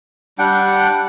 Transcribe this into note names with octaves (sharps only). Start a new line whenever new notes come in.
G3 D4 F#5 G5